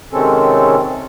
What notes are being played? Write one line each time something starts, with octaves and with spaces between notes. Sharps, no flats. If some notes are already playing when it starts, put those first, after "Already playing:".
C3 D#3 G#3 C4 C#4 A4